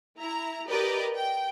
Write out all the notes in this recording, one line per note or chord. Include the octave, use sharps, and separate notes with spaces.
E4 A#5
G4 A#4 B4 D5 D#5
G5